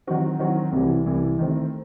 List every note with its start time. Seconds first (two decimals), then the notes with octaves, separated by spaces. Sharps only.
0.07 D#3 F#3 C4 F#4
0.39 D#3 F#3 C4 F#4
0.72 C2 C3 E3
1.06 C2 C3 E3
1.39 D#3 A3 C4